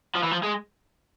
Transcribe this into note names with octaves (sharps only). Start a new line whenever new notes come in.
F3
E3
F3
G#3